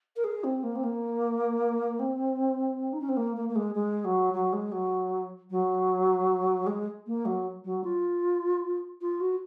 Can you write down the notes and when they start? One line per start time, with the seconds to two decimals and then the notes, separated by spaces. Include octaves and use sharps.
0.16 A#4
0.24 G#4
0.44 C4
0.63 A#3
0.75 C4
0.83 A#3
1.99 C4
2.93 D#4
3.01 C#4
3.09 C4
3.17 A#3
3.36 A#3
3.49 A#3
3.56 G#3
3.75 G#3
4.05 F#3
4.34 F#3
4.53 G#3
4.72 F#3
5.50 F#3
6.67 G#3
7.07 A#3
7.26 F#3
7.64 F#3
7.84 F4
9.01 F4
9.20 F#4